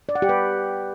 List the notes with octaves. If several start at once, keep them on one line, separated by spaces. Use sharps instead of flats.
D5
F#5
G4
B4